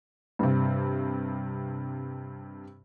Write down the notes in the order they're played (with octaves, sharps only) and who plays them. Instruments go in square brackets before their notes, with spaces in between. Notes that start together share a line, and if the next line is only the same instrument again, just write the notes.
[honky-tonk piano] G2 C3